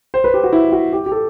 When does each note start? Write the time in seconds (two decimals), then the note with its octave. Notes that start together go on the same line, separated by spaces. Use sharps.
0.14 C5
0.24 B4
0.34 G4
0.44 F#4
0.53 E4
0.72 F#4
0.93 G4
1.06 G4
1.12 A4